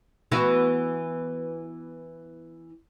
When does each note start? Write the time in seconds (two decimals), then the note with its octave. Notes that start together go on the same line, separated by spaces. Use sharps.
0.32 E3 B3 F#4